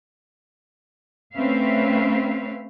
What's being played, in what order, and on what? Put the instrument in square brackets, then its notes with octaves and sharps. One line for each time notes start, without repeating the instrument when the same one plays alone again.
[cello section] A3 C4 C#4 B4 E5 F5